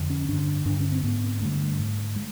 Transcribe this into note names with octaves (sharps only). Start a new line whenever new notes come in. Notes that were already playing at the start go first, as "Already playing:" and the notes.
Already playing: F2 D3
C#4
G2 D3 D4
G2 D3 D4
C#4
C4
G#2 B3
G2 D3 A3
G#2
G#3